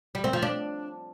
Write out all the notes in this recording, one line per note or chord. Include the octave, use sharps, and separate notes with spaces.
G3
C4
F3
D4